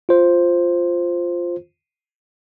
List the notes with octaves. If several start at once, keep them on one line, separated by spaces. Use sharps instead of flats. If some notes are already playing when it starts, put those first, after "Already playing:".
F4 C5